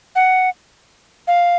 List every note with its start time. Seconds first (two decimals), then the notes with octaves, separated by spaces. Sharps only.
0.16 F#5
1.27 F5